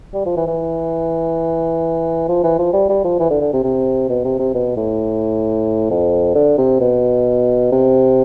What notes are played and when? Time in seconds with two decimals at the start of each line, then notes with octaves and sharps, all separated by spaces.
0.14 G3
0.26 F3
0.37 E3
0.47 E3
2.29 F3
2.44 E3
2.59 F3
2.73 G3
2.90 G3
3.04 F3
3.19 E3
3.31 D3
3.41 D3
3.53 C3
3.64 C3
4.10 B2
4.24 C3
4.39 C3
4.54 B2
4.77 A2
5.90 F2
6.35 D3
6.58 C3
6.81 B2
7.72 C3